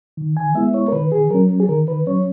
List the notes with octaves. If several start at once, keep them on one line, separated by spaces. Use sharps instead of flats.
D#3
G#5
G#3 B3 E4 E5
C#5
A#4
D#3 B4
G#4
F#3 C#4 A#4
G#4
D#3 A#4
B4
F#3 C#4 C#5